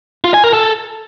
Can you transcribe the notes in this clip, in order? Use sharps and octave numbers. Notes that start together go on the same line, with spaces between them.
F4
G#5
A#4
A4